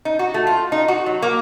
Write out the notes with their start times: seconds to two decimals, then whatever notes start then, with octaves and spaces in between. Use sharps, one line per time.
0.05 D#4
0.19 F#4
0.34 A3
0.47 F4
0.72 D#4
0.88 F#4
1.06 F#3
1.22 A#3